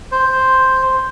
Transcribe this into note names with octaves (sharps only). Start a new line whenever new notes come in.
C5